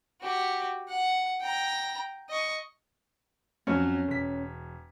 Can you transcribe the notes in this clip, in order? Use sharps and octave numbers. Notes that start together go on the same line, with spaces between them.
F#4 G4
F#5
G5 A#5
D#5 C#6
F2 F3 F#3 C#4
E1 B6